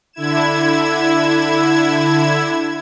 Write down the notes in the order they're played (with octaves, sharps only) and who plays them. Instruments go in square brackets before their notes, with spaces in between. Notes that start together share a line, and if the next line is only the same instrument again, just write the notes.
[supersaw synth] D3 E4 G#6 E7